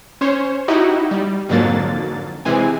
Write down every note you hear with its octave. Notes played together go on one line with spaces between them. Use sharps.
C#4 C5 C#5
D#4 E4 F#4 G4 D#5
G3
F2 G#2 D3 F#3 A#3 A6
C3 E3 G#3 C4 G#5